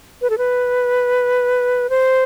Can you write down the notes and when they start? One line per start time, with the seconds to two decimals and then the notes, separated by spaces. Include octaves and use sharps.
0.22 B4
0.30 A4
0.38 B4
1.90 C5